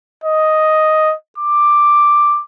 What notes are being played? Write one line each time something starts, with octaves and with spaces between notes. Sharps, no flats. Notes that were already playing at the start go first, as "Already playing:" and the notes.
D#5
D6